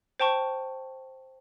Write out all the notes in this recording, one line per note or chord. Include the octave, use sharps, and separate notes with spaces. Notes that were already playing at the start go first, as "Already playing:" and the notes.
C5 G5 A5 C#6